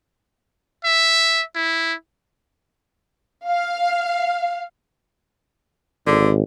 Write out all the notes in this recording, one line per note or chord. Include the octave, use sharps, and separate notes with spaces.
E5
E4
F5
G#1 D3